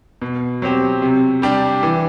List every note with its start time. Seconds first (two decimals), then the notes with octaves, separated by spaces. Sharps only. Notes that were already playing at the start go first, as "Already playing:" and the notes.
0.22 B2
0.62 F#3 C4 G4
1.02 C3
1.42 G3 D4 G4
1.83 E3